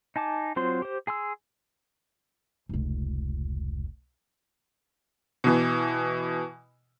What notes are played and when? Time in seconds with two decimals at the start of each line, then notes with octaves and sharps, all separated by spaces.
0.16 D#4 G#5 A5 D6
0.56 F#3 C4 F4 C5 C6
0.82 G4 C5
1.07 G#4 G#5 C6 E6
2.69 F1 C#2
5.44 B2 E3